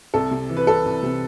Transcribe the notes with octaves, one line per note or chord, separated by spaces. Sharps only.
C2 A4
C3
E3
B4
C2 A4
C2
C3